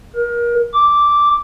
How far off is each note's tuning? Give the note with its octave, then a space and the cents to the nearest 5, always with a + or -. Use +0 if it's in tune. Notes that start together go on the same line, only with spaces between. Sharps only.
A#4 +30
D6 -5